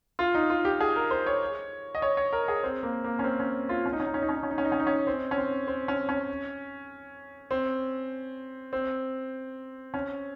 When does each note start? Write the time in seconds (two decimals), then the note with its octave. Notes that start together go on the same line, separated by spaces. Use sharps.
0.19 F4
0.35 D#4
0.50 F4
0.65 G4
0.80 G#4
0.96 A#4
1.11 C5
1.27 C#5
1.95 D#5
2.02 C#5
2.17 C#5
2.33 A#4
2.48 G#4
2.63 C4
2.83 A#3
3.04 A#3
3.19 C#4
3.24 C4
3.40 C#4
3.69 F4
3.86 C#4
3.93 D#4
4.00 C#4
4.06 D#4
4.14 C#4
4.22 D#4
4.29 C#4
4.36 D#4
4.43 C#4
4.51 D#4
4.58 C#4
4.65 D#4
4.72 C#4
4.79 D#4
4.87 C#4
5.07 C4
5.31 C#4
5.38 C4
5.67 C4
5.88 C#4
6.09 C#4
7.51 C4
8.73 C4
9.94 C#4